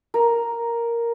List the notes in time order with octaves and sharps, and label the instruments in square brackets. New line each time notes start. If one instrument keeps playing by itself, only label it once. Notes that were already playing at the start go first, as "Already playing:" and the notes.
[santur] A#4